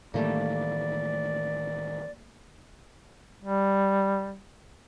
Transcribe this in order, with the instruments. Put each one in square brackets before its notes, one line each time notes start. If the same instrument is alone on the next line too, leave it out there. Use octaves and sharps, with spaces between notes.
[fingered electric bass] A2 D#3 E3 [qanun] G3 A3 A#3 [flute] D5
[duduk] G3